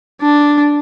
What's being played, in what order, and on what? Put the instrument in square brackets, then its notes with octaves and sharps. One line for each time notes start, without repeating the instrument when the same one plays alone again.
[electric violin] D4